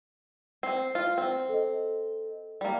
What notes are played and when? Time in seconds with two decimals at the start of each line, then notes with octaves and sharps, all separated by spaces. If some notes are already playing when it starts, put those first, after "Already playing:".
0.63 C4 C7
0.95 F4
1.18 C4
1.49 A4 D#5
2.61 G3 A#3